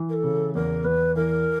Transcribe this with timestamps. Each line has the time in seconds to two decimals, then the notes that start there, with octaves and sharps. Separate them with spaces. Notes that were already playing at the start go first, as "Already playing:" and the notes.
Already playing: E3
0.09 A#4
0.13 A4
0.24 C#3
0.55 E2 A#4
0.84 E2 B4
1.15 E3 A#4